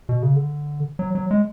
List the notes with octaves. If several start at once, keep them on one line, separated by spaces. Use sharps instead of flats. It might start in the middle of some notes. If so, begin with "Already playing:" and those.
B2
C#3
D3
F#3
F#3
G#3